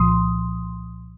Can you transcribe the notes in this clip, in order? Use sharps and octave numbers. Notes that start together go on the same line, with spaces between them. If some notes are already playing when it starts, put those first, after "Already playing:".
Already playing: C2 A#2 F3 C6 D#6